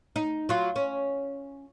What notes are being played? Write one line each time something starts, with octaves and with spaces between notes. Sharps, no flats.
D#4
F#3 F4
C#4